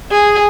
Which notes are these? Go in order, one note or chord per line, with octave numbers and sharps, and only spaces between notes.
G#4